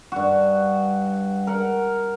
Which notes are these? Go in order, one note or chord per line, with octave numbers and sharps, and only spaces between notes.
G2 F#4
A#4 F#5